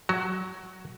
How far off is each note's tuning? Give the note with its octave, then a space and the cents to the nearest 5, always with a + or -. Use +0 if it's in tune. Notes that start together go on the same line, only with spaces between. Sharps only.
F#3 +0 F#4 +20